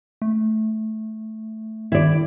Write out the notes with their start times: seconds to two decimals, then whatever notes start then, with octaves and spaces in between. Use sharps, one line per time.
0.22 A3
1.92 D#3 E4 D5